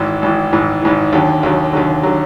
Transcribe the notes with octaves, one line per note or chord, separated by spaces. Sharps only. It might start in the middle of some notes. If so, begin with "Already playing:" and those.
Already playing: G#1 G#2 E3
G#1 G#2 E3
G#1 G#2 E3
G#1 G#2 E3
D#2 D3 F#3
D#2 D3 F#3
D#2 D3 F#3
D3 F#3